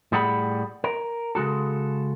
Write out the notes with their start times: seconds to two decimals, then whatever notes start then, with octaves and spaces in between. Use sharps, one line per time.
0.12 A2 G3 G#4 F#5 A5 B5
0.84 A#4
1.35 C#3 G#3 F#4 A4